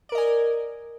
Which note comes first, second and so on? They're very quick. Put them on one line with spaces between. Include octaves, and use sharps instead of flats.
D5 A#4 D#5 G#5